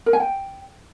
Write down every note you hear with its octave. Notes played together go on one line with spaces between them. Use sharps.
A#4
G#5
G5